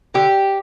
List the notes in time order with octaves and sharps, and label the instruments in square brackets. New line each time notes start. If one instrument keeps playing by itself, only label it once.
[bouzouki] D3 G4